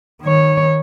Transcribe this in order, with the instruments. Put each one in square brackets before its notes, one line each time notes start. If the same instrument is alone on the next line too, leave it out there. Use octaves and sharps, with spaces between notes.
[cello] D#3 C#5